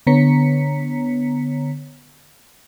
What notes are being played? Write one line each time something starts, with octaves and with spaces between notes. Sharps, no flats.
D3 B3 C#5 A#5 B6 C#7